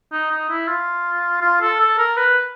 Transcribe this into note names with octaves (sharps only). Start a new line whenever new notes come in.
D#4
D#4
E4
F4
F4
A4
A4
A#4
B4